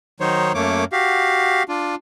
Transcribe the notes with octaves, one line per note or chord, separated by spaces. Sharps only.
D#3 F#3 D#4 C5 C#5
F#2 A3 A#3 C#5 D6
F#4 G4 F5
D4 F4